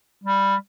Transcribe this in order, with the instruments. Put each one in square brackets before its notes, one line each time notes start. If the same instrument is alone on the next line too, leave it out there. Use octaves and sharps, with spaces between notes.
[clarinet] G3